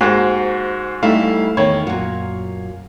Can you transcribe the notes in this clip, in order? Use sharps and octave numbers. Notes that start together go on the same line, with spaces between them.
G#2 A#3 F#4 G4 C5
G3 A3 D#4 E4 F5
E2 D#3 C#5
F#2 A#2 F#4